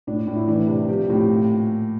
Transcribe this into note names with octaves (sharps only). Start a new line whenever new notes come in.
A2 D4
A2
E4
E3 D4
C3
F3 G4
A2
A#2